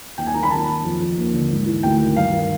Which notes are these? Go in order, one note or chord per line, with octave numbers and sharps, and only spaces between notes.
D#2 G5
G#5
D#3 A#5
B5
D#3 A5
D#3
F2
F2
D#2
D3
G#2
E3
D2 G5
D#3
G2 F5
D#3